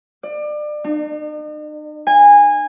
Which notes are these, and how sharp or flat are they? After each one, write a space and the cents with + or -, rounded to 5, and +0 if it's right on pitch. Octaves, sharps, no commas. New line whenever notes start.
D5 +30
D#4 -45
G#5 -20